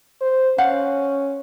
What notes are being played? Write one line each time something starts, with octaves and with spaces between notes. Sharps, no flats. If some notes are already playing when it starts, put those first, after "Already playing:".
C5
C#4 C5 F5 F#5